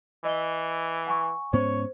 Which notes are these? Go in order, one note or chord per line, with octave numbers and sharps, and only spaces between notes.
E3 D#5 G7
F#5 G#5 C#6
G#2 B3 C#4 C5 C#5